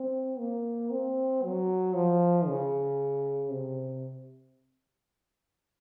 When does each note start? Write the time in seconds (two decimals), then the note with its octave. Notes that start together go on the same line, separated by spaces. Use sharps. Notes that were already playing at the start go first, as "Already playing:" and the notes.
Already playing: C4
0.39 A#3
0.91 C4
1.43 F#3
1.95 F3
2.47 C#3
3.51 C3